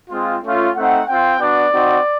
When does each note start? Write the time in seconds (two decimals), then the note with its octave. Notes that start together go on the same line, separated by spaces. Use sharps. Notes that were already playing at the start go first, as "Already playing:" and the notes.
0.10 G#3 C4 F4
0.42 A3 C#4 F4
0.75 A3 C4 D#4 F#5
1.07 C4 F4 G5
1.40 B3 D4 F#4 D5
1.72 C4 D#4 F#4